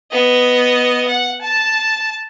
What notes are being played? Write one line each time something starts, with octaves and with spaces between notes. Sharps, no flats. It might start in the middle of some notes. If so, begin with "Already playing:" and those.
B3 D#5
F#5
A5